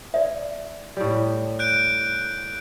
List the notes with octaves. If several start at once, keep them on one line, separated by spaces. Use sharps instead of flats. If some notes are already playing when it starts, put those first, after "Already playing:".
D5 E5
A2 G3
F#6 G6 D7